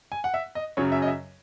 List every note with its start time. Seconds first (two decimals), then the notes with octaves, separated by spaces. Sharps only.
0.12 G#5
0.24 F#5
0.34 E5
0.55 D#5
0.77 F#2 C#3 F#3 C#5
0.92 E5
1.02 D#5
1.07 E5